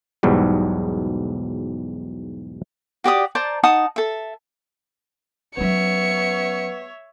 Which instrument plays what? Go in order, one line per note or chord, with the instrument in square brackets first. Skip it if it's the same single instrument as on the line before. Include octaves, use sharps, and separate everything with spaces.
[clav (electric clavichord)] B1 E2 G#2 F#3 G3
[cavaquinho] F#4 G4 D5 D#6
C5 D5 A5 A#5
D#4 F#5 A5 D#6
A4 E5
[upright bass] F#3 C#4 [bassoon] B3 [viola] C#5 E5 [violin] C#7